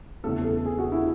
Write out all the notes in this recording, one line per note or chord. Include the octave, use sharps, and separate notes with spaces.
E2 C#3 E3 A3 A4
A4
G#4
F#4
E4